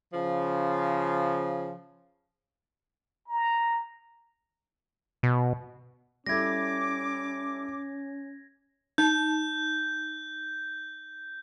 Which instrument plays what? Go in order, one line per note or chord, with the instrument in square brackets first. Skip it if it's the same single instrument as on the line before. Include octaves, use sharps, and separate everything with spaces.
[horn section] C#3 F3
[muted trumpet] A#5
[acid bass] B2
[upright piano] G3 E4 A4 [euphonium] C#4 [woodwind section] D6 [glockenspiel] G#6 A#6
[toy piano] D#4 A5 [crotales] G6